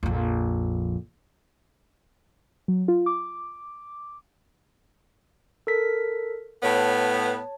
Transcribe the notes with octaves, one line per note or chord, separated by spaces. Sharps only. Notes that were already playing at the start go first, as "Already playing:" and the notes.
A#1 F2
F#3
F4
D6
A4 A#4 B6
A2 B3 C#5 A5